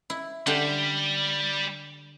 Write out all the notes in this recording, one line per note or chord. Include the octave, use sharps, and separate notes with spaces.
E4
D3 G3 G4